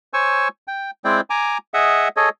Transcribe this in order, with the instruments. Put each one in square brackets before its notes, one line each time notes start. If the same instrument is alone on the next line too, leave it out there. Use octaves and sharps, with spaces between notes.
[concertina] C5 C#5 G#5 C#6 E6
G5
G#3 C4 E4 C5 D5 G5
G#5 A#5 D6
G#4 D#5 E5 F#5
G#4 A4 C#5 D#5